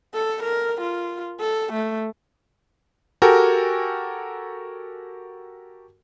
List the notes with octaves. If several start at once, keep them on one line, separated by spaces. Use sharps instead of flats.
A4
A#4
F4
A4
A3
F#4 G4 A4 A#4 G5 G#5